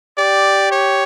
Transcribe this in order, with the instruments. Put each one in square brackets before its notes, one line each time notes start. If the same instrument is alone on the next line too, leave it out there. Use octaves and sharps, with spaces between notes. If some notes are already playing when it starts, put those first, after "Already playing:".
[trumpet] G4 [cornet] D5
[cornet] C#5